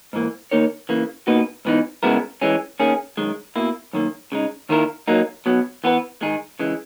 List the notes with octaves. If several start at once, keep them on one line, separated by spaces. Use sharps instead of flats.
G#2 E3 A#3
D#3 A#3 D#4 A#4 C#5
C#3 E3 A#3
B2 A#3 D#4 F#4 B4
G#2 E3 B3 D#4
C#3 G#3 B3 E4 A#4
E3 G#3 C#4
D#3 A#3 C#4 G#4
F#2 D#3 G#3
B2 A#3 E4
F#2 D#3 A#3
C#3 G#3 D#4
D#2 D#3 A#3 E4 A#4
F#3 A#3 D#4
B2 F#3 B3
E3 B3 F#4 B4
G#2 D#3 G#3 D#4 G#4
C#3 E3 G#3